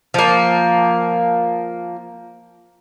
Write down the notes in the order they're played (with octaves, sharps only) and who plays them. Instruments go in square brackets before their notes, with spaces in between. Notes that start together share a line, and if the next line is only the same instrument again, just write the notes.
[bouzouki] F3 A#3